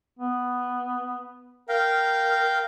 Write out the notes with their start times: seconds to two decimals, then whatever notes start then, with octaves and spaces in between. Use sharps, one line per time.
0.19 B3
1.69 A#4 F5 G5